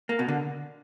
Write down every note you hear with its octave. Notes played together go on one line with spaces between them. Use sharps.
A#3
B2
D3